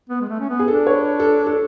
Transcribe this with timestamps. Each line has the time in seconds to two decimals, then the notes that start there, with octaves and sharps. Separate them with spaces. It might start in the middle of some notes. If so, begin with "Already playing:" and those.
0.10 B3
0.21 G#3
0.29 A3
0.40 C#4
0.50 B3
0.59 G#4
0.68 D4 A4
0.87 C#5
0.94 B4
1.20 A4
1.47 A4